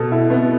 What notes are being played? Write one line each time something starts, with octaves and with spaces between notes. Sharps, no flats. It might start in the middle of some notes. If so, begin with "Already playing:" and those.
Already playing: B2 A4
E4
B3